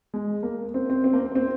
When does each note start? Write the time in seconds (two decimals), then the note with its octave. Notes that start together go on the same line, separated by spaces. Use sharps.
0.14 G#3
0.43 A#3
0.74 C4
0.90 C4
1.04 C4
1.13 A#3
1.20 C4
1.35 C4